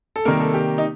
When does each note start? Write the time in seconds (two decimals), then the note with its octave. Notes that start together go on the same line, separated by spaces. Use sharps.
0.16 A4
0.25 C3 D#3 G3 A#3 A#4
0.40 A4
0.54 G4
0.78 D#4